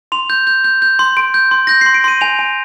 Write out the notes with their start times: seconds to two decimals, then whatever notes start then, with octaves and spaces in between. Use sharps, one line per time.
0.12 C6 F7
0.30 G6
0.47 G6
0.64 G6
0.82 G6
0.99 C6
1.17 C6 D7
1.34 G6
1.51 C6
1.67 G6 A#6
1.81 C6 C7
1.94 D7
2.04 C6 D#7
2.21 G#5 F7
2.39 G#5